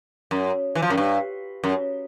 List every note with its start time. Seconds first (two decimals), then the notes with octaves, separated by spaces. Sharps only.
0.31 F#2
0.75 E3
0.82 F3
0.90 F#2
0.98 G2
1.64 F#2